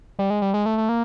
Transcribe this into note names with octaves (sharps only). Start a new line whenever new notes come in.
G3
G#3
G3
G#3
A3
A3
A#3